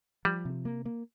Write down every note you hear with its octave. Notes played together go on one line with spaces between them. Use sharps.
F3 G3
C3
A#3
A#3